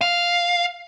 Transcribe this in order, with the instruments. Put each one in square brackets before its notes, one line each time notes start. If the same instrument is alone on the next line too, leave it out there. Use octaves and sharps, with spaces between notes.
[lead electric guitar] F5